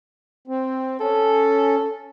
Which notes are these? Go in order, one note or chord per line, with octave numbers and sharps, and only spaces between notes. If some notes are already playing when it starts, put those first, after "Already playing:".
C4
C#4 A4